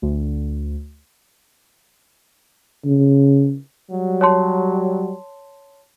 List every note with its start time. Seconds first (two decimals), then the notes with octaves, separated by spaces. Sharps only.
0.02 D2
2.86 C#3
3.91 F#3 G3
4.21 C#5 A5 C6